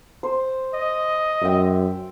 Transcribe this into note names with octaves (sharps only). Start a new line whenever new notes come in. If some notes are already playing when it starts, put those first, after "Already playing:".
C5
D#5
F#2 E5 G5